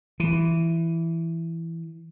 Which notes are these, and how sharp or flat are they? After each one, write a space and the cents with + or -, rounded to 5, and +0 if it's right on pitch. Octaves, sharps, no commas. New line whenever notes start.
E3 +5